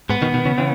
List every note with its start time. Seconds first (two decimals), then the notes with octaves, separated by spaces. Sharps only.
0.09 G#2 B3
0.22 B2 D#3
0.34 B2 D#3
0.46 C#3 E3
0.58 C#3 E3